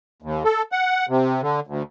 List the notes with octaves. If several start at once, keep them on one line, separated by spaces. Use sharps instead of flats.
D#2
A4
F#5
C3
D3
D2